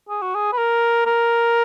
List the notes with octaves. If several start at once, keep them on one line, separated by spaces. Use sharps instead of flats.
G#4
F#4
G#4
B4
A#4
A#4